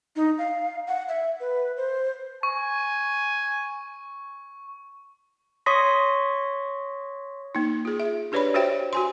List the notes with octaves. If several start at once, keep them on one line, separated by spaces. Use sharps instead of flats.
D#4
F5
F#5
E5
B4
C5
G#5 C#6
C#5 C6 C#6 D#6 A#6 B6
A#3 D#4
F4 G#4
E5
D4 G4 B4 C#5 D5 B5
F#4 G4 C5 C#5 E5 G5
F#4 G#5 C6